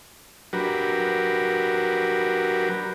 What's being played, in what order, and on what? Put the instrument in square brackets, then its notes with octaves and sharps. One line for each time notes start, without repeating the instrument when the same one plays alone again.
[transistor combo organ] F#3 D4 F#4 G4 A#4 B4